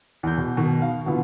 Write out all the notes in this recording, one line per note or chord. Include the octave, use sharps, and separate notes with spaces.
E2 G6
B2
B2 D#3
F5
B2 D3 E3 B3 F4